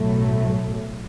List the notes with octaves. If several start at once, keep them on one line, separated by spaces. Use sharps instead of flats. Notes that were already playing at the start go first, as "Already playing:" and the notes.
Already playing: B1 A2 F#3 A3